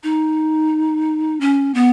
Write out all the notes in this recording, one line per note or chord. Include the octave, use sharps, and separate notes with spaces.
D#4
C#4
B3